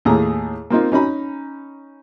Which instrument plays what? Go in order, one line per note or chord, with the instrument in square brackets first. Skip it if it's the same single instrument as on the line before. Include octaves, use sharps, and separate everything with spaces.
[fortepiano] D#2 A2 A3 G#4 A#5
A#3 C4 D#4 F4
C#4 D#4 A#5 B5